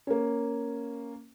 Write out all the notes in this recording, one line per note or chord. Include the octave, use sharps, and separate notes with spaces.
A#3 C#4